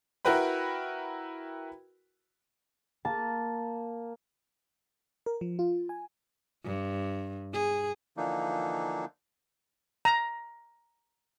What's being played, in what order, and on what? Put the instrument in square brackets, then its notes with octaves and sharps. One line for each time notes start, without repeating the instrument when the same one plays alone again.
[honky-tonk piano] E4 F#4 A#4 B4 G5 B5
[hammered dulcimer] A#3 [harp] A5
[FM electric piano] A#4
F3
F4
G#5
[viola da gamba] G2
G#4
[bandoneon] D3 E3 F3 A#3 D4 D#4
[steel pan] A#5